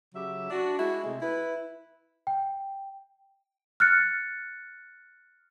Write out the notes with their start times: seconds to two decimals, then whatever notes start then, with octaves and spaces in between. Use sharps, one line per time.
0.15 C#3 F#3 G4 E5
0.50 D4 F#4
0.78 G#3 E4 F#4
1.04 C3 G#3 A3
1.21 E4 B4
2.27 G5
3.80 F6 F#6 A6 C#7